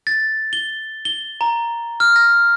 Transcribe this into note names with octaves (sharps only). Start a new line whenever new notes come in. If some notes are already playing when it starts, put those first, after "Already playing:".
A6
G7
G7
A#5
F6
A#6